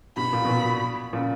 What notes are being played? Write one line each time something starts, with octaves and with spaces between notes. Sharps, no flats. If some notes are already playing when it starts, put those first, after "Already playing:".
G2 B2 B5
A#2
B2
A#2
A#2 C#3